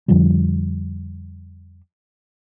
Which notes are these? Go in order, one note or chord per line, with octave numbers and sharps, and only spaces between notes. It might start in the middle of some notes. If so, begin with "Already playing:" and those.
F2 D3 F3 G3